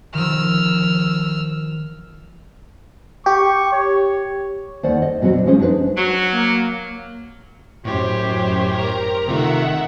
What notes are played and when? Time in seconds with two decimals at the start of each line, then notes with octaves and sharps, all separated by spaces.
0.14 D#3 F3 E6 F6
3.26 G4 C#6
3.73 C#5
4.83 D#2 C5 D5 F#5
5.02 D#5
5.21 E2 B2 F#3 C4 F#4 C5
5.33 D4
5.46 F3 G#3 C#4 G#4 C5
5.59 D4 D#4 G#4 B4 C5
5.97 F#3
6.31 A#3
7.85 F#2 A2 G4 C5 C#5
8.68 A#4 A#5
9.28 C3 D#3 A3 F4 E5 F#5